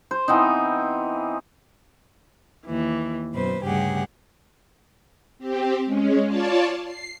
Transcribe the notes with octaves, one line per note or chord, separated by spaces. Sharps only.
C5
E3 B3 C4 D#4
D#2 E3
F#2 B2 B4 C5
D2 G2 C#3 G4 G#4 F#5
C4 G4
G#3 C#4
F4 C#5 D5 A5
C7